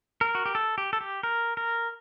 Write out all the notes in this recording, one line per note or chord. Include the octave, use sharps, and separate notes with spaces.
A#4
F#4
G4
A4
G4
A4
G4
A#4
A#4